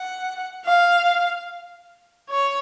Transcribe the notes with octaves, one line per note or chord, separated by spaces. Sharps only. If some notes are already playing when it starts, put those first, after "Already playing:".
Already playing: F#5
F5
C#5